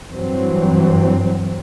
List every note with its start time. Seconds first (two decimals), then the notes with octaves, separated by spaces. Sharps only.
0.12 G2 E3 F#3 C4